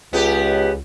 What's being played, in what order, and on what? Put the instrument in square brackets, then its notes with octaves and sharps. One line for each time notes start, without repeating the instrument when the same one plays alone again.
[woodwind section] C#2 [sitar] B3 G4